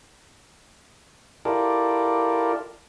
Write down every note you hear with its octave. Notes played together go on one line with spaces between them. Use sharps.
E4 F4 G4 A4 A#4 D5